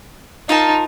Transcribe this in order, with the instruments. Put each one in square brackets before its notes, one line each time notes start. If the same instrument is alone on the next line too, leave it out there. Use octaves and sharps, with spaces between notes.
[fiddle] D#4 [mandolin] F4 A#4 A5